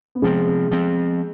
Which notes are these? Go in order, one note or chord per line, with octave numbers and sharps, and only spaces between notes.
B3
C3 F3 G#3 C4
F3 C4